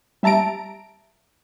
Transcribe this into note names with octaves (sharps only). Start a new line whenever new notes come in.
G3 E5 A5 A#5 D7